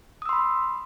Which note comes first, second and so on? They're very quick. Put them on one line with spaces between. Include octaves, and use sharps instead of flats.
D#6 E6 C6 B5